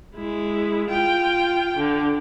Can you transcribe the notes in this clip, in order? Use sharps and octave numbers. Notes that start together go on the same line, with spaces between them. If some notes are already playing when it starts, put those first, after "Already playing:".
G#3 E4
F4 G5
D3